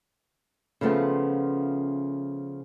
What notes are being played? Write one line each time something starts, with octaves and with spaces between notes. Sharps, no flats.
C#3 F3 A3 B3 F4